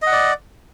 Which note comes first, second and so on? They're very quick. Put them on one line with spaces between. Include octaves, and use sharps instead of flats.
D#5 F#5 D5